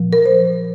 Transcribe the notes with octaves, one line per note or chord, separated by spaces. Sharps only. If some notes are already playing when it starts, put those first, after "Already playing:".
Already playing: A#2 F3
A#4
C5